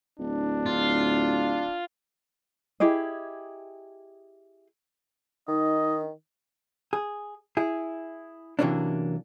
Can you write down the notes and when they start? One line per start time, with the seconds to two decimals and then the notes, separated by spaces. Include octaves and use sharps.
0.19 D1 D4
0.66 F4
2.80 E4 G4 G#4 D#5
5.48 D#3 D#4 D#5
6.93 G#4
7.57 E4 G#4
8.59 C3 E3 F#3 A#3 C#4 D4